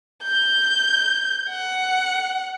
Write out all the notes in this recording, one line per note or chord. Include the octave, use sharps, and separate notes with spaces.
G6
F#5